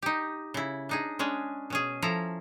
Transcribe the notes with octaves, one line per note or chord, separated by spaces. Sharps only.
D#4 G4
C#3 E4
D4 D#4 G#4
G#3 C#4 D4 G#4
B2 C#4 G#4
F3 E4 A4 A#5